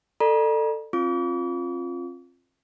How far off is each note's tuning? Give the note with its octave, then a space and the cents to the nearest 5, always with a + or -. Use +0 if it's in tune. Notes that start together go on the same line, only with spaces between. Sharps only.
A4 +20 D5 +35 A#5 +45
C4 +35 F4 +0 D6 -45